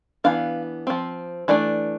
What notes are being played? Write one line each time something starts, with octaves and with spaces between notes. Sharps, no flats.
E3 B3 D4 F5
F3 C4
E3 A3 D4 D5